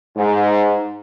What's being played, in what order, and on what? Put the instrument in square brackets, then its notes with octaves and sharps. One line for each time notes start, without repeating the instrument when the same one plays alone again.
[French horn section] G#2